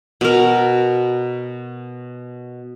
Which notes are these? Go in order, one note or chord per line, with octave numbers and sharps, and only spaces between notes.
B2 A#4